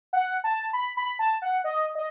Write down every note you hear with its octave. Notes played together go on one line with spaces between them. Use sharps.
F#5
A5
B5
B5
A5
F#5
D#5
D#5